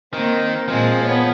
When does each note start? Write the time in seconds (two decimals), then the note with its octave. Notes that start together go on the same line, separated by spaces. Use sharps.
0.13 D#3 A#3 C4
0.68 A#2 F3 G#3 C4
1.03 B3 C#5